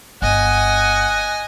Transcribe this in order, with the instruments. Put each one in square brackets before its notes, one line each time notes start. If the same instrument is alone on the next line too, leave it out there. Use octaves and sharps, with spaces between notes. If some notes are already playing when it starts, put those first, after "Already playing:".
[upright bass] G1 [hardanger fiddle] D#5 G#5 [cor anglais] F#5